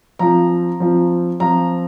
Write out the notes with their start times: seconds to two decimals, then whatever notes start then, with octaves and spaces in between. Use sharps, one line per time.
0.19 F3 C4 F4 A#5
0.80 F3 C4 F4
1.40 F3 C4 F4 A#5